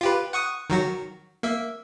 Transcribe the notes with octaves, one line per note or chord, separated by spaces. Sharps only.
F4 G4 B4
F#5 C#6 D#6
D#3 F#3 F#4
A#3 E5